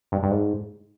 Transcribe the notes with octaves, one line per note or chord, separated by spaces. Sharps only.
G2
G2
G#2